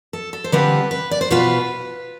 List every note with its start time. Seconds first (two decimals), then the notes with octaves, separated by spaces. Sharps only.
0.13 A4
0.33 A4
0.44 C5
0.52 D3 G3 C4 F4 B4
0.91 B4
1.11 D5
1.21 C5
1.31 B2 B3 F4 B4